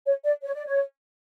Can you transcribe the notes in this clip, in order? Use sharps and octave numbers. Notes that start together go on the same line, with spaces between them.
C#5
D5
C#5
D5
C#5